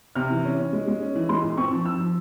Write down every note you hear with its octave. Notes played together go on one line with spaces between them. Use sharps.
C3 F6
E3
C#4
C#4
G#3
G#3
C#4
E3
G#3 C6
A#2
C4 C#6
F3
F3 E6
F3